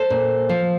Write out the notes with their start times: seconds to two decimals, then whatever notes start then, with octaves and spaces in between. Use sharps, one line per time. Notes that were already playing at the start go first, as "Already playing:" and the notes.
Already playing: A4 C5
0.10 A#2
0.49 F3